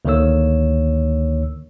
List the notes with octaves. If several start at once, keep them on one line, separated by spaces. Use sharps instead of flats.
D2 D3 D#3 A#3 C#5 E6